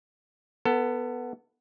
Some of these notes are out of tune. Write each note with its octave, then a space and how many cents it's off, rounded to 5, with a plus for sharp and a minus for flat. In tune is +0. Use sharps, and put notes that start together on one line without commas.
B3 +0 A4 +25